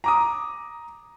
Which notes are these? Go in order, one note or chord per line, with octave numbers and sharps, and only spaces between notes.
A#5 D6 D#6